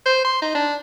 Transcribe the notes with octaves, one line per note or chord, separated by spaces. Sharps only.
C5
C6
D#4
D4